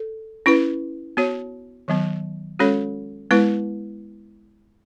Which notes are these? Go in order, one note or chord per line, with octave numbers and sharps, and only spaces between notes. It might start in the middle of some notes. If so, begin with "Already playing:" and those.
Already playing: A4
C#4 E4 B4
B3 F#4 C#5
D#3 F#3 B3
G#3 C#4 F#4 A4 C#5
G#3 B3 E4 B4